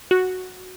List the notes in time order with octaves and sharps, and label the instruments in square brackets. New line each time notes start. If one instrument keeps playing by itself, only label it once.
[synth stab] F#4